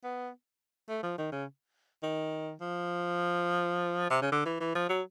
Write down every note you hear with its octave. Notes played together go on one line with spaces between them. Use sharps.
B3
A3
F3
D#3
C#3
D#3
F3
C3
C#3
D3
E3
E3
F3
F#3